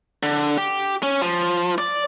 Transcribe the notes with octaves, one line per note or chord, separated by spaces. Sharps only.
D3
G4
C#4
F3
D5